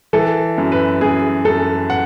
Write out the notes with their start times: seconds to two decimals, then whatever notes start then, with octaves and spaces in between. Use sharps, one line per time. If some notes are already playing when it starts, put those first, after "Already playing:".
0.13 E3 A4
0.58 F#2
0.72 B4
1.01 F#2 G#4
1.45 F#2 A4
1.90 F#5